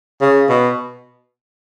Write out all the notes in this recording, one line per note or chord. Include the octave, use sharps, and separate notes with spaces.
C#3
B2